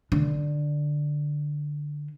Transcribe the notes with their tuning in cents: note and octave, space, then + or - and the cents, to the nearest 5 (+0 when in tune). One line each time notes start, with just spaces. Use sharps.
D3 +5